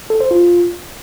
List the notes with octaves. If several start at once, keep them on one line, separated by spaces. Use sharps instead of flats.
A4
C5
F4